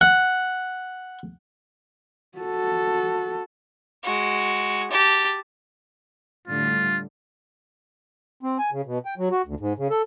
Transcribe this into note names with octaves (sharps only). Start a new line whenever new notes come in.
F#5
F#4 A4
G#3 F#4
G4 A5
A2 D3 G3 F4
C4
G#5
C#3
B2
G5
F#3
F#4
D2
G#2
C#3
A4